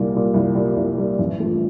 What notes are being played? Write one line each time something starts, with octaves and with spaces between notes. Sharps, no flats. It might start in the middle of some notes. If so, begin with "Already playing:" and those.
Already playing: C2 A#2 G3
A#2 G3
C2
A#2 G3
C2
A#2 G3
A1
G2 F3 A3